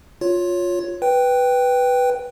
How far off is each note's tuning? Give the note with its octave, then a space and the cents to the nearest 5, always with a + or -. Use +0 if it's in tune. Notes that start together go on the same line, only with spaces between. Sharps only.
F4 +15 C#5 +5
B4 +0 G5 +0